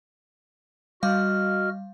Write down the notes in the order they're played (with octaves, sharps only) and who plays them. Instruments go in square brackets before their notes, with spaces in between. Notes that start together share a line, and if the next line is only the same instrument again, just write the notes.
[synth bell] G3 F5 [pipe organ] F#4 D#5 F6